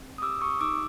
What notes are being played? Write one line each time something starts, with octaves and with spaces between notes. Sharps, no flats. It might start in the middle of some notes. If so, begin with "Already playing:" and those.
Already playing: C4
D#6
G4 D6 E6
C#6 D#6
D#4 D6 E6